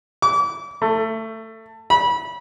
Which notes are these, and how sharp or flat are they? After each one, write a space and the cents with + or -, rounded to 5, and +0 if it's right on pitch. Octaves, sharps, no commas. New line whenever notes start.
D6 -35
A3 +20
B5 -25